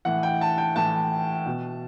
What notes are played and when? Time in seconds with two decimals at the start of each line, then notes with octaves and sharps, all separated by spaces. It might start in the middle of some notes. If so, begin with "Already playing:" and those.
0.05 A2 E3 F#5
0.23 G5
0.41 A5
0.58 G5
0.76 A2 E3 A5
1.46 B2